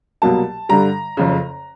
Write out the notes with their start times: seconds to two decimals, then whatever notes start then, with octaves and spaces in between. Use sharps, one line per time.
0.22 C2 B2 F#3 A#3 A5
0.69 G2 D3 G3 A#5
1.17 F#1 F2 C#3